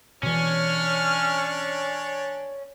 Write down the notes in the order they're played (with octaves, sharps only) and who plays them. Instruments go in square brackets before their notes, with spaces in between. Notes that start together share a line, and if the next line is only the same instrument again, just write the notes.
[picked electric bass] B2 E3 [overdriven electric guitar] C#4 [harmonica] D4 C#5 [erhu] F6